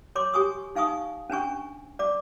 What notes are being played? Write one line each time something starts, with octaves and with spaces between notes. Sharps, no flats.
C#5 C6 D6
G4 G#5 C#6 D#6
D#4 F5 G#5 C#6 D#6
C#4 D4 G#5 C#6
D5 D6